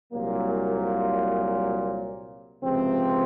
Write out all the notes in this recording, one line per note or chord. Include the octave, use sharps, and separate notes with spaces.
C2 A#2 F#3 A#3
C#2 C3 F3 C4